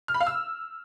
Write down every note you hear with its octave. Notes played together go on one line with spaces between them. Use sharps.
F6
B5
F5
E6